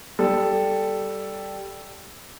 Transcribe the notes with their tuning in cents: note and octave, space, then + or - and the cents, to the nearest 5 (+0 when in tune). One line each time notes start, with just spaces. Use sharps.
G3 +0 A4 +0